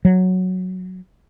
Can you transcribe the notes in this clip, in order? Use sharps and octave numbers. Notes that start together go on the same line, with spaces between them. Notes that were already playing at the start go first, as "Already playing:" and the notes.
F#3